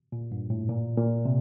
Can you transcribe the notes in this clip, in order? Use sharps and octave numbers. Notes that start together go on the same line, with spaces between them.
A#2
G2
A2
A#2
A#2
C3